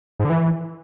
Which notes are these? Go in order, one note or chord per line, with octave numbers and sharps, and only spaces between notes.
G#2
D3
E3